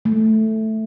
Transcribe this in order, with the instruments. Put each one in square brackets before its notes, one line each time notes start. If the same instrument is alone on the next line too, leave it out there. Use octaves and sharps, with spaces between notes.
[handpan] A3